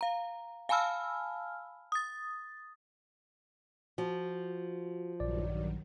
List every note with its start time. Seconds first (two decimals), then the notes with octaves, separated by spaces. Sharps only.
0.01 F5 A#5
0.69 F5 G#5 A5 B5 E6 F6
1.92 D#6 A6
3.98 F3 F#4
5.20 A#1 G2 D#3 F#3 D5